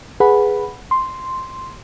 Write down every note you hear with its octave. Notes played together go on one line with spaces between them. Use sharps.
G#4 B4 F#5 B5
C6